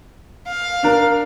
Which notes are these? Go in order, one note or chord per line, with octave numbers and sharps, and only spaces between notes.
F5
D4 A#4